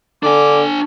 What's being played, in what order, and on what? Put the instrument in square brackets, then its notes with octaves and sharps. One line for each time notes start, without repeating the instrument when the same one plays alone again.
[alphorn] D3 [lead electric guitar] D4 G#5 [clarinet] D6